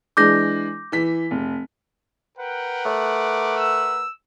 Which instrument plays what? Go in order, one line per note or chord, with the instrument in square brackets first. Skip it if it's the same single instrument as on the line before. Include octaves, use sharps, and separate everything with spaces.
[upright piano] E3 G#3 D4 [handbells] D6 G6 A#6
[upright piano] E3 B6
F1
[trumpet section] A#4 B4 F#5 [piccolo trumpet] G5
[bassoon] A3 [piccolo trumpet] D6
[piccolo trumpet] E6